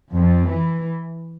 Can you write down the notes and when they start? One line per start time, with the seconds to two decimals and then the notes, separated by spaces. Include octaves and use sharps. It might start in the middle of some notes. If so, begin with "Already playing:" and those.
0.12 F2
0.49 E3